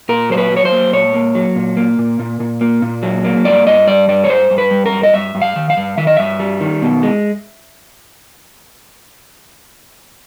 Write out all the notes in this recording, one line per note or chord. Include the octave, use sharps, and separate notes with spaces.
A#2 A#4
F#3 C5
B4
F#3
C#5
C5
A#3
A#2 C#5
A#3
F#3
A#2
A#3
A#2
A#2
A#2
A#3
A#2
F#3
A#3
G2 D5
G2 D#5
G3 D5
G2 D5
C#5
G2 C5
G2
B4
G3
A#4
G2
D#5
G2 E5
G2
F5
D#3
F5
G2
D#3 E5
D#5
G2 E5
G3
D#3
B2
G#3